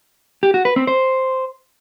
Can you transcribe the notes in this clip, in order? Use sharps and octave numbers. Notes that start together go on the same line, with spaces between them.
G4
F#4
B4
C4
C5